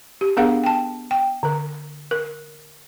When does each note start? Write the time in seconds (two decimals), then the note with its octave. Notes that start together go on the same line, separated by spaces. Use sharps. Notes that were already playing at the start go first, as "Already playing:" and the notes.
0.21 G4
0.37 B3 D4 G#4 A#4 F5 F#5
0.64 G5 A5
1.11 G5
1.43 D3 A#4
2.11 A#4